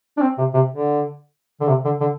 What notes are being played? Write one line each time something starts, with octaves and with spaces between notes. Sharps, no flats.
D4
C4
C3
C3
D3
D3
C3
D3
D3